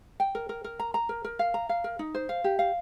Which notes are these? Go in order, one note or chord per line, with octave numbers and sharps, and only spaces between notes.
G5
A#4
A#4
A#4
A#5
A#5
A#4
A#4
F5
A#5
F5
A#4
D#4
C5
F5
G4
F5